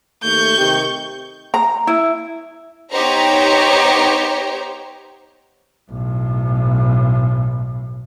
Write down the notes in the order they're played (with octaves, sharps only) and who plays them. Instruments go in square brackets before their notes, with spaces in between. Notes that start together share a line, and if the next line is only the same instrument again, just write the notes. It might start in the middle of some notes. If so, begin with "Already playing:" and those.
[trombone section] D#2 A3 [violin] C#6 G6
[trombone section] C3 D#3 G4
[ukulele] A#5
E4
[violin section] B3 D#4 G4 C5 C#5 A#5
[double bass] B1 A2